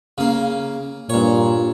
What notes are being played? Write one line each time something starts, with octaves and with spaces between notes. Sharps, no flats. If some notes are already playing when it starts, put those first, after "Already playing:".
C#3 A#3
G2 A#2 C#5